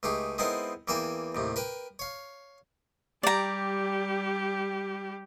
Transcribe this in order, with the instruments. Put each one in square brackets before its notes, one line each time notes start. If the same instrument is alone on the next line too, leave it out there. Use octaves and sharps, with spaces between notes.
[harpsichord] C#2 A3 D#4 G4 G#4
G#3 B3 C4 D#4 E4 A#4
E2 E3 A#3 E5 G5 G#5
D#2 A2 C3
A#4 B4 G5
C#5 F5
[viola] G3 G4 [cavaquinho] D5 A#5